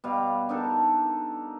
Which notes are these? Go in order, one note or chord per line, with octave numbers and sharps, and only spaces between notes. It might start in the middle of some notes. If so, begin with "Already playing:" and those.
B2 G3 F5
D4 D#4 A4 A#4